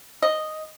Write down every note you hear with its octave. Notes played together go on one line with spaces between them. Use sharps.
D#5